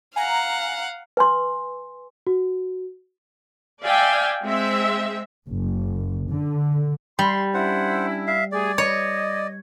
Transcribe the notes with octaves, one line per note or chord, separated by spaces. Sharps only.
F5 F#5 G#5 A#5
B4 G#5 C6
F#4
D5 E5 F5 G5 G#5
G#3 C4 E5
F#1
D3
G3 C6
C#4 D4 E4 C5 F#5
E5 F5
A3 G4 G#4 D5
C#5 D#5